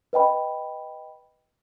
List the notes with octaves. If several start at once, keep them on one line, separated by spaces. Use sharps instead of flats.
B4 D#5 G5 B5